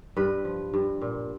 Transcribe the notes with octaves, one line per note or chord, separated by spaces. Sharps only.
G2 B4
F3
G2
A#2